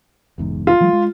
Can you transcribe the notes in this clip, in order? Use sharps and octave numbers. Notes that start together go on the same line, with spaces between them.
F#1 E2 G#2
F4
E3 F#3 G#3
G#3